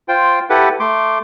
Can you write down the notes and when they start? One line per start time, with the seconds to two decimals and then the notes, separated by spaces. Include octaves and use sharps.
0.08 F4 C5 G5
0.50 E4 G4 A4 B4 F#5
0.80 A3 C6 D6